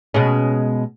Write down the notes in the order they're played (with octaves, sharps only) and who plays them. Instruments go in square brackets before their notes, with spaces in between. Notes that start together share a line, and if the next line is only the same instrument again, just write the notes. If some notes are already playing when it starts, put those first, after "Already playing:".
[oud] B2 G#3 C#4